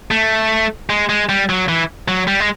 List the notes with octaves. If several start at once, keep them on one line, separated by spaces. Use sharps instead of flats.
A3
G#3
G#3
G3
F#3
E3
F#3
G3
G#3